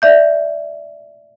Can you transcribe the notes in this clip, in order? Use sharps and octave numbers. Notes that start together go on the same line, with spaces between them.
D5 E5 G6